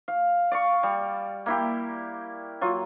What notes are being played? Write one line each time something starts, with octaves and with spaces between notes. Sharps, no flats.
F5
D5 F5 C#6
G3
A#3 E4 G4
F#3 F4